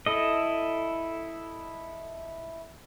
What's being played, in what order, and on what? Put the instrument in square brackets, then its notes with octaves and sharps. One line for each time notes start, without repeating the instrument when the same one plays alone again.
[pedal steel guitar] E4 A4 D#5